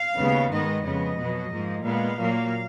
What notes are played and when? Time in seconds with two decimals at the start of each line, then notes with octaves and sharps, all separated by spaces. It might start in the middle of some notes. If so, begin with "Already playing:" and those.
Already playing: F5
0.17 D#2 C#3 G#3 B3
0.51 G#2 D#3 G#3 B3 D#5
0.84 F2 C#3 G#3 B3 D#5
1.17 B2 F#3 B3
1.50 G#2 F3 A#3
1.84 A#2 G#3 B3 F5
2.17 A#2 F#3 A#3